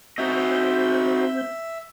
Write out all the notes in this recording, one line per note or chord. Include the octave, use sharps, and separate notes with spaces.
C4 D#4 F#4 D#5 E5 G6